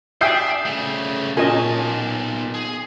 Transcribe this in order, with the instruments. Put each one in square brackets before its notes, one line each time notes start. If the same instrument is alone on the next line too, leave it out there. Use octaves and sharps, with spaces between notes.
[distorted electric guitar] D4 [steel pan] E5 G5 G#5 [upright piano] D#6 G6 C7
[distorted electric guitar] C#3 A3
[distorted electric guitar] B1 A5 [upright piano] A#2 [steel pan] C#4 D#5 G#5
[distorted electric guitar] G#4